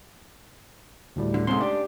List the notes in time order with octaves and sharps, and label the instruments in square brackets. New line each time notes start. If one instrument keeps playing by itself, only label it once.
[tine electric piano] D2 A2 G3
[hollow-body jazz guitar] D3
[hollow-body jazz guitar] G#2 C3 [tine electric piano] A3 C#4 C6
[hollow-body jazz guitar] D4 [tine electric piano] G4